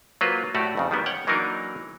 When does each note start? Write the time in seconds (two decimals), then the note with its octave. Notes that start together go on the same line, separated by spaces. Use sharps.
0.21 F#3 A#3 F4 B4 C5
0.55 A2 A3 F#4 G4 D5
0.77 F2 C#3
0.91 D#3 G3 B3
1.06 C#5 F#5 G5
1.27 E3 F#3 A#3 D4 D#4 A#4